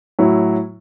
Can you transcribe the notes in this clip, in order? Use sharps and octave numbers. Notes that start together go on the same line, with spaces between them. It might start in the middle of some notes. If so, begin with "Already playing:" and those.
A2 F#3 E4